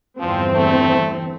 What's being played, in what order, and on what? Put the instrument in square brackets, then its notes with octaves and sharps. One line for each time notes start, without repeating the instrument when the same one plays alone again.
[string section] G1 E2 C4 [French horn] F3
[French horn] A3